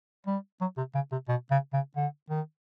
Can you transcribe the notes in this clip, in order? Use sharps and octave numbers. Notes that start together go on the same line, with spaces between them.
G3
F#3
C3
C#3
C3
B2
C#3
C#3
D3
D#3